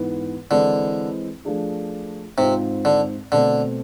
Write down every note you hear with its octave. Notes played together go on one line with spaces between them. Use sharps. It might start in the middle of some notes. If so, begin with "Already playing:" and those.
Already playing: G#2 E3 B3
D3 E3 G#3 C4 E4 A4
F3 A3 D4 G#4
G#2 C3 G#3 C4 F4
D3
B2 D3 A3 C4